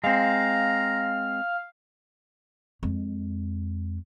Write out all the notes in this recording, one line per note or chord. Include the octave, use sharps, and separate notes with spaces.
G#3 C4 F5 A#5
F2 G#3